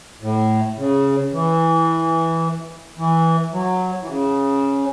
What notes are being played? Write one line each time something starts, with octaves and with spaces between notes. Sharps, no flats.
A2
C#3
E3
E3
F#3
E3
C#3